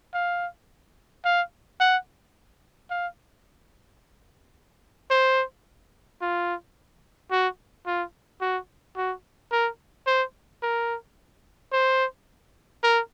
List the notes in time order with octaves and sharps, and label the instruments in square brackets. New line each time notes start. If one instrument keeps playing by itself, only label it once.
[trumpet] F5
F5
F#5
F5
C5
F4
F#4
F4
F#4
F#4
A#4
C5
A#4
C5
A#4